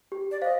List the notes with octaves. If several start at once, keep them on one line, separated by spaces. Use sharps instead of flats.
G4
D5
C5 D#5 F5